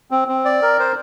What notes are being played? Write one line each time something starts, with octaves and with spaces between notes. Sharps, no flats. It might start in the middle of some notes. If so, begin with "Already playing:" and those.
C4
C4
D5
A#4
C5